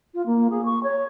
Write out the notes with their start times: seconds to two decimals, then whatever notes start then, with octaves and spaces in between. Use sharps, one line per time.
0.14 F4
0.26 A#3
0.50 G#4
0.65 C#6
0.83 C#5